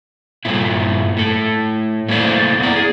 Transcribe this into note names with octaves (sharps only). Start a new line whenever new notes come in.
G2 A#2 E4
A2 A4
A3 A#3 E4 C5 D5
B3 D5
G#4